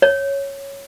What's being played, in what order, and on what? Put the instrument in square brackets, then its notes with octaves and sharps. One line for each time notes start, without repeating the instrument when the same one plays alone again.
[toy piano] C#5